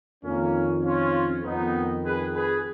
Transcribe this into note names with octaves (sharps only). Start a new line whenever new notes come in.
F2 D#3 A#3 C#4
C#4 F4
F2 D#3 B3 D#4
G#4 B4
G#4 B4